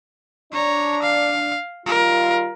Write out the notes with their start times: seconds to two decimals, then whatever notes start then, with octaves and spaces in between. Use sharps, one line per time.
0.53 D4 C#5 A#5
1.03 F5
1.86 D#3 G3 F4 A#4